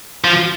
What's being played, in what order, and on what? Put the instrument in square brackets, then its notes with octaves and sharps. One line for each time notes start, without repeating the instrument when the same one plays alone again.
[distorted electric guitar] F3